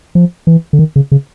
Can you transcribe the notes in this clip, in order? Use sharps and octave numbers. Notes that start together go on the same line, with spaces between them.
F3
E3
D3
D#3
C#3
C#3